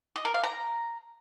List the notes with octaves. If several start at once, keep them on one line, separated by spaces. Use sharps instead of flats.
D#5
A#4
F5
A#5